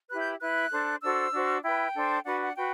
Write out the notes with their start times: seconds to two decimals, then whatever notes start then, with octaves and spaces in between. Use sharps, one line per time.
0.10 E4 G4 B4 F#6
0.20 G6
0.40 E4 B4 F#6
0.71 D4 A4 C5
1.02 D4 F#4 A4 C5 E6
1.33 D4 F#4 C5
1.63 E4 B4 G5
1.94 D4 A4 C5
2.25 D4 F#4 B4 F#5
2.40 F#5
2.56 F#4 B4 G5